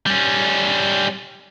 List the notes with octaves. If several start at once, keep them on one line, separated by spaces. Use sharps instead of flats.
G3 C#4